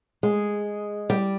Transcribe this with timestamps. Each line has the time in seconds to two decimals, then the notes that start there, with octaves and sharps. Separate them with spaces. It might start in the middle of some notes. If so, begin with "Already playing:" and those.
0.23 G#3
1.10 G3